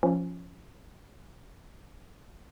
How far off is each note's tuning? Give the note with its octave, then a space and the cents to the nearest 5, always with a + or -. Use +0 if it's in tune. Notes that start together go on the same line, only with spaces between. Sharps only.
F3 +0 C#4 +0